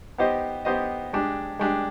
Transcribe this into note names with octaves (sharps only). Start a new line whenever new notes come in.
B3 D#4 G4 C5 D#5
B3 D#4 G4 C5 D#5
G#3 D4 G4
G#3 D4 G4